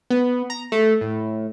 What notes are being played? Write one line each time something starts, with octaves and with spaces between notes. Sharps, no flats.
B3
A#5
A3
A2